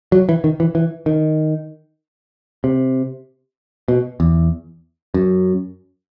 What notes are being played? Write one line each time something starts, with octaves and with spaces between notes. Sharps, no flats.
F#3
E3
D#3
E3
E3
D#3
C3
B2
E2
F#2